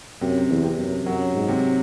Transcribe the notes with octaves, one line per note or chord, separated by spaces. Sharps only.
F#2 C3
E2
C3
F#2
F#2 F#3
G#2
C3